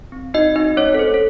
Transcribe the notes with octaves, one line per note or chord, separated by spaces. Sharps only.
C4
D#4 F#4 D#5
C4 D#4 D#5
A3 C#4 C#5
A4
A3 C5
A4